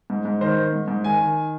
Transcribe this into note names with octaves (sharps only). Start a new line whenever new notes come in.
G#2
G#2
D#3 C5
D#3
G#2
G#2
D#3 G#5
D#3